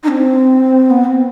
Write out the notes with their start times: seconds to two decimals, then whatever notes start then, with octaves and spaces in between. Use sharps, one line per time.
0.04 D#4
0.08 C4
0.90 B3
1.05 C4